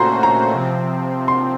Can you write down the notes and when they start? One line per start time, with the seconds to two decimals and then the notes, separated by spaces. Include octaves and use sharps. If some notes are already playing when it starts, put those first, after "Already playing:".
Already playing: A#2 A3 C#4 F#4 C5 A#5 C6
0.23 A#5
0.52 C3 F3 C4
1.28 C6